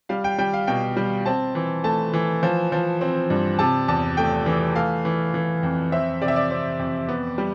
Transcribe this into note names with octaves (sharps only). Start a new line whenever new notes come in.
G3 F5
G5
G3 G5
F5
B2 G5
G3
C4 A5
E3
A3 A5
E3
F3
F3
C4
G2
C3 A5
E2 A5
A3 G5
E3
A3 F5
E3
E3
F2
C4 E5
C3 D5
E5
D5
C4
F2
B3
G3